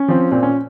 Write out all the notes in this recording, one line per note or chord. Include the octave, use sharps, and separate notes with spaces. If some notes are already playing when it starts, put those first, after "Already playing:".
Already playing: C#4
F3 C4
A#2 C4
C#4